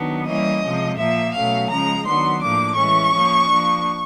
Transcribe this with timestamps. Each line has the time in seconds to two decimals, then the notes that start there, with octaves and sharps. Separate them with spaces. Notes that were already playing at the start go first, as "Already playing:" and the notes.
Already playing: D#3 F#3 B3 D4
0.27 E3 G3 A#3 C#4 D#5
0.64 C3 F3 G#3
0.99 A#2 F3 A#3 E5
1.35 B2 F#3 A3 C#4 F5
1.70 C#3 F3 G#3 A#5
2.07 D#3 F#3 B3 D4 C6
2.42 A2 F3 A#3 D4 D6
2.77 E3 G#3 C#4 C#6
3.14 F3 A#3 C#4
3.50 F3 A#3 D4